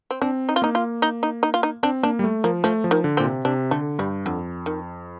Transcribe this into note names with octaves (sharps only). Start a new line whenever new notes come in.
C4
C4 D4
D#4
F4
A#3 D#4
F4
D#4
D#4
D#4
F4
D#4
C4 D4
A#3 D4
G3
A3
F3 A#3
F3 A3
F3
D#3
D3
A#2 C4
C3
C3 D4
D3 A3
G2 G3
F2 D3
D#3